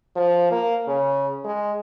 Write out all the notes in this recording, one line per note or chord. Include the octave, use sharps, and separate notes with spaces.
F3
A#3
C#3
G#3